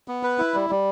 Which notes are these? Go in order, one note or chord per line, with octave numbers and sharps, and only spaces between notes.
B3
B4
E4
G3
G3